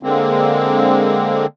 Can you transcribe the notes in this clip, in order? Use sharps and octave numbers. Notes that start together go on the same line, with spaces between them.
D3 G#3 A#3 C4